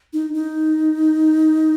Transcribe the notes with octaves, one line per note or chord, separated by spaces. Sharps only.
D#4
D#4